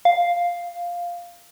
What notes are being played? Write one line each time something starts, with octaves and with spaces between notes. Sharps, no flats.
F5